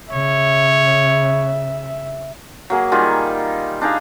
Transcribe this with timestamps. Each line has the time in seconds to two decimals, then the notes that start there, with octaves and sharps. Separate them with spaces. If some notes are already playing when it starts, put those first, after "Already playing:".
0.12 C#3 C#5 E5
2.70 F#3 A#3 G#4
2.92 D#3 G3 F4 G#4
3.81 D4 D#4 G#4 F5